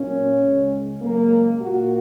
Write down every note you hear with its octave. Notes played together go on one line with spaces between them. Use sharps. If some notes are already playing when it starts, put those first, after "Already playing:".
Already playing: A#2 F#3 A#3 C#4
C#2 C#3 G#3
F#2 C#3 G#3 A#3
A#2 A#3 F#4